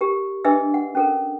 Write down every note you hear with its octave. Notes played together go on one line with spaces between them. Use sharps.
G4 A#4
D4 G#4 B4 D#5 E5 E6
F#5
C#4 A4 A#4